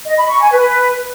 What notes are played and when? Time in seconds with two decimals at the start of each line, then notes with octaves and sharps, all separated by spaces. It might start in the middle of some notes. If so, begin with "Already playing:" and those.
0.06 D#5
0.17 B5
0.29 C#6
0.40 G#5
0.52 B4